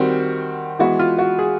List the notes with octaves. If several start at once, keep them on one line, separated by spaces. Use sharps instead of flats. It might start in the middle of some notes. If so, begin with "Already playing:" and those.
Already playing: D#3 G3 C4 F#4
E3 G#3 B3 F#4
F4
F#4
G#4